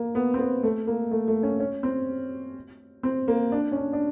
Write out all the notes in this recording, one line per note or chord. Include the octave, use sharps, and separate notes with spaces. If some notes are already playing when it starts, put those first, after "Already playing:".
Already playing: A#3
B3
C4
B3
A3
A#3
A3
A3
C#4
C#4
C4
C4
A#3
D4
C#4
D4
D4